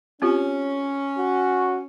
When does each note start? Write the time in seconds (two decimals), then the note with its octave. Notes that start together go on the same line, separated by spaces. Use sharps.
0.22 C4 C#4 F4 G4
1.18 F#4